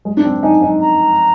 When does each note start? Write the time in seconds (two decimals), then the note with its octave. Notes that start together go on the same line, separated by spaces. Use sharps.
0.05 G#3
0.17 D4
0.24 C4
0.43 D#4 G#5
0.62 D#4
0.80 A#5